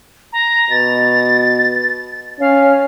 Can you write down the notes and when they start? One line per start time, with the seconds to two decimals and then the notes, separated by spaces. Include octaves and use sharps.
0.33 A#5
0.71 B2 A6
2.40 C#4 F5